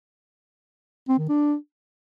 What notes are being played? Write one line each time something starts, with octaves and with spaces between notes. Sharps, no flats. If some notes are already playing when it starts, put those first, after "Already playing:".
C4
D#3
D4